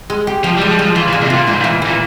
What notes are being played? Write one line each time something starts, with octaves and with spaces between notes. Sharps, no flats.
G#3
G4
F3 G4
G3
F3 G#3
G3
F3 G#3
E3 F4
A#2
G#3
C3
A#2 F4
G#2 E3
A#2
E3
A#2 E3